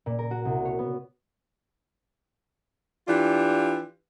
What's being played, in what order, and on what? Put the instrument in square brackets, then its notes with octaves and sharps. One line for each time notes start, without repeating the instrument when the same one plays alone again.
[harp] A#2
A#4
F#4
C2
C#5
B3
[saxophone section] E3 D4 F4 G4